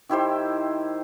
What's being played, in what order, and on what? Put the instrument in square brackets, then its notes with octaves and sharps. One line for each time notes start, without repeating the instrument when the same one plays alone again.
[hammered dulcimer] D#3 E4 G4 C5